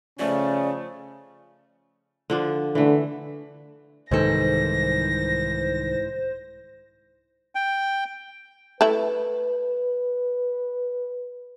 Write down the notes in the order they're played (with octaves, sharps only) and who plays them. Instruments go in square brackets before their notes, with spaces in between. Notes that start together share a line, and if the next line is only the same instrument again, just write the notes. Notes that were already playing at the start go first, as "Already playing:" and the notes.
[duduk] C#3 [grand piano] F3 A3 [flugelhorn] C#4 [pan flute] D5
[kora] D3 F3 D4
[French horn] D3 [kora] E3 A3
[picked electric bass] C2 D#3 [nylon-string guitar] G#2 E3 A4 [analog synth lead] C5 [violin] A#6
[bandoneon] G5
[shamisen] A3 E4 [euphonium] B4